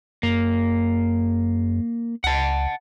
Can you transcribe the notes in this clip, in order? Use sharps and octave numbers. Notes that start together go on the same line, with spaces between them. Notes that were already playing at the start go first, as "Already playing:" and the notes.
F#2 A#3
C#2 F#5 A5